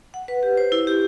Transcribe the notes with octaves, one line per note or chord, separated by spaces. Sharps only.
F#5
B4
G4
C5
E4
G4